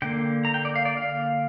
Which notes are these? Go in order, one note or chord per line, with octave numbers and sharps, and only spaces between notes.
D3 A#3 G5
A#5
G5
D5
F5
D5
F5